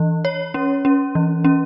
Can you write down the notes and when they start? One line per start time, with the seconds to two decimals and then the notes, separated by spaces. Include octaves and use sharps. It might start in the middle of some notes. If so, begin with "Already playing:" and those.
Already playing: E3
0.25 C#5
0.54 C#4
0.85 C#4
1.15 E3
1.44 C#4